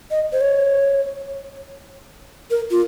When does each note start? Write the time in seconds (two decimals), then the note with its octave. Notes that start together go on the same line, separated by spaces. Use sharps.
0.11 D#5
0.33 C5
0.41 C#5
2.51 A#4
2.71 F4